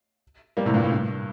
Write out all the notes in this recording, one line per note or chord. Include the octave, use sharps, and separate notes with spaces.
G3 A#3
A2 C3
G2 A#2
A2
G2